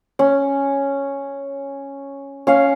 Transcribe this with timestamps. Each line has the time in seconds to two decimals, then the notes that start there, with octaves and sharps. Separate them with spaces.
0.19 C#4
2.47 C#4 F5